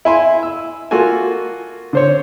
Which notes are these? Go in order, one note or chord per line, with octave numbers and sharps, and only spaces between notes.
E4 G#5 C6
E6
A#3 F4 F#4 A4 G#5
D3 C5 C#5